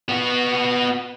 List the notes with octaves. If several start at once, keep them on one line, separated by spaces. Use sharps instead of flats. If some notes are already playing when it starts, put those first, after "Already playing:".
B3 F#4